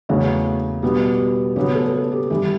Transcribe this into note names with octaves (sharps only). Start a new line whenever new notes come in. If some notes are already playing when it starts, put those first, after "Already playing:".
E2 C#3 F#3 A3 F#4
B2 G3 B3
C#3 F#3 B3 G4
A4
A4
G4
G2 E3 G3 G4